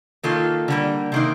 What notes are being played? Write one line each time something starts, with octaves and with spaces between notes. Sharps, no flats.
D#3 A#3 F4 A4
D3 G3 A#3
C3 D#3 A#3 D#4